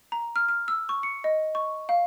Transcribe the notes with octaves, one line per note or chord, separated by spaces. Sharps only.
A#5
F6
F6
E6
C#6
C#7
D#5
C#6
F5